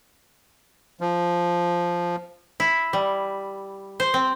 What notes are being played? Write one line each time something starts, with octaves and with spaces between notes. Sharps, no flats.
F3
E4
G3
C5
C4